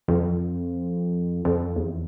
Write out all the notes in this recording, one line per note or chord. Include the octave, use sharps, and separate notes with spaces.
F2
F2
E2